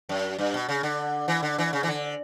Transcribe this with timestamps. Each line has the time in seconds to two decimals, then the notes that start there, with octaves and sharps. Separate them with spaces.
0.09 F#2
0.39 G2
0.54 B2
0.69 C#3
0.83 D3
1.28 E3
1.43 D3
1.58 E3
1.73 C#3
1.83 E3
1.88 D3